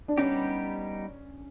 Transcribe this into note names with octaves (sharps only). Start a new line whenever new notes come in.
D4
G3 B3 C#4 D#4 G4